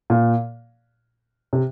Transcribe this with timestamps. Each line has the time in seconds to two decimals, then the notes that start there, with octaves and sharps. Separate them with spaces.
0.10 A#2
1.53 C3